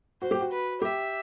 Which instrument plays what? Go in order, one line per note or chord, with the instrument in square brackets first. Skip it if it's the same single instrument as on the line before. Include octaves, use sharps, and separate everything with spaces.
[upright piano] F#4 [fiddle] C5
[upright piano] G4
F#4
[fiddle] B4
[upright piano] G4 [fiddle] E5